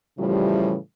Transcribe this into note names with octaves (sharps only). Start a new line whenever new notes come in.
A2 C#3 E3 F3 G3